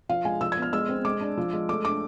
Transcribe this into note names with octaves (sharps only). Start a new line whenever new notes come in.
F3 F5
G#3 G#5
F3 E6
G#6
B3
F6
G#3 E6
C4
G#3 D6
D4
F3
G#3
A3 D6
D4 D6